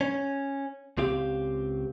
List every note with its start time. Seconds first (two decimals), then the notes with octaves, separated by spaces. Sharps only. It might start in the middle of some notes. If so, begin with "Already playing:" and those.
0.01 C#4
0.97 C#2 C4 G4 F5